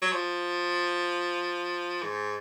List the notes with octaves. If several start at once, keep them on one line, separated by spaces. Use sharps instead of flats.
F#3
F3
G#2